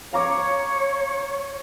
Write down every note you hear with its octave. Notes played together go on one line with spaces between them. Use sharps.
C#5 F5 A#5 D6